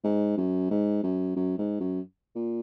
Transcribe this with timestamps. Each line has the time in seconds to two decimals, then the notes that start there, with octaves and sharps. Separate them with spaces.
0.04 G#2
0.37 F#2
0.70 G#2
1.03 F#2
1.36 F#2
1.58 G#2
1.80 F#2
2.35 A#2